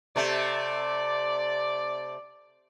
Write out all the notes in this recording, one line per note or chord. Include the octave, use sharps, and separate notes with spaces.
C3 A3 D5